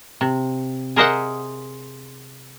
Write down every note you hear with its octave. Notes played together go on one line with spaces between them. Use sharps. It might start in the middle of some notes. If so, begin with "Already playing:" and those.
C3
G#4 A#4 C5 D#5 E5 F#5